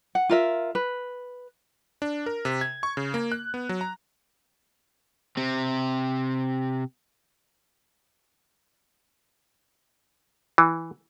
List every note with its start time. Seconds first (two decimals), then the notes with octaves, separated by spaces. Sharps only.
0.15 F#5
0.29 F4 A#4 E5
0.75 B4
2.02 D4
2.26 A#4
2.45 C3
2.61 G#6
2.83 C#6
2.97 C#3
3.14 A#3
3.32 F#6
3.54 B3
3.69 F#3
3.81 A#5
5.37 C3 C4
10.58 E3